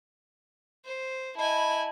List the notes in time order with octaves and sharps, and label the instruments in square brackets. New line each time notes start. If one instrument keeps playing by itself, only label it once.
[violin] C5
[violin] E4 G#5 [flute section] D#5 A5 B5